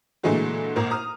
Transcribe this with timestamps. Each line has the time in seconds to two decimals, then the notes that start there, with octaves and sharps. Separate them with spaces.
0.23 A#2 D3 E3 G#3 A3 F#4
0.76 G#1 A#2 A#4
0.91 A#5 D#6 F6